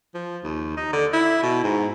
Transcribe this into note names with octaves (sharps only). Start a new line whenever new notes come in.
F3
D#2
D#4
D3
E4
B2
G#2